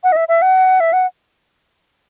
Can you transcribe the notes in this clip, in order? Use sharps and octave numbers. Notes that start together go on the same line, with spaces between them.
F#5
D#5
E5
E5
F#5
E5
F#5